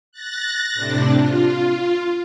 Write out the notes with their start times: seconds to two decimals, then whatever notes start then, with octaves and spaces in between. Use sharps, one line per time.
0.12 F#6 A6 A#6
0.74 A2 C3 D4
1.18 F4